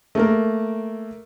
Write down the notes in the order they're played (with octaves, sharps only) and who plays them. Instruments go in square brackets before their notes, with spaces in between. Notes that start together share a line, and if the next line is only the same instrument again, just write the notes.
[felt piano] A3 A#3 A#4